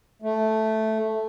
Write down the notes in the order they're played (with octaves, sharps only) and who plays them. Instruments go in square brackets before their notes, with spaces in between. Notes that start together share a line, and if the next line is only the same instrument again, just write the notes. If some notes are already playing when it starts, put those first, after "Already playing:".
[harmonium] A3